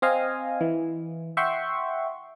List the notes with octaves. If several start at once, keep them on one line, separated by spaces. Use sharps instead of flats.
C4 D#5 F5 G#5
E3
E5 F#5 G5 C6 C#6